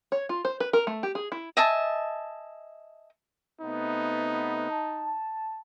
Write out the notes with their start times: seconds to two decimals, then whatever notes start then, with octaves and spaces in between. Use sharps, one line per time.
0.12 C#5
0.29 F4
0.45 C5
0.60 B4
0.73 A#4
0.87 A3
1.03 G4
1.15 G#4
1.32 E4
1.57 D#5 E5 G#5 A5
3.61 C3 A3 B3 D#4
4.70 A5